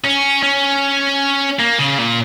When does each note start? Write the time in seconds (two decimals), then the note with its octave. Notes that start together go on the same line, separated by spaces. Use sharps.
0.04 C#4
0.43 C#4
1.59 A#3
1.79 C#3
1.99 A#2